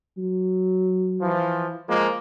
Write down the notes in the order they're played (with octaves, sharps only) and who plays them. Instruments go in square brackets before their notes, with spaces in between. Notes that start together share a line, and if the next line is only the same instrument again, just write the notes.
[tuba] F#3
[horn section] E3 F3
F3 G#3 A#3